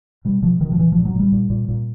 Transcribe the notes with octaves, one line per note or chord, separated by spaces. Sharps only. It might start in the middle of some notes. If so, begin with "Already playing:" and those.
B2 G3
B2 F3
B2 D#3
F3
A#2 E3
A#2 F3
F#3
A#2 G3
A#2
A#2
A#2